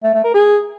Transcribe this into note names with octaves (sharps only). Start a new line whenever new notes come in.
A3
A3
A#4
G#4